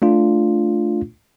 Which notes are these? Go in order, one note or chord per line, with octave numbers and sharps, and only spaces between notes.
A3 D4 F4